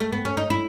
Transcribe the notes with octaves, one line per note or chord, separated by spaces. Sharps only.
A3
B3
C#4
D#4
E4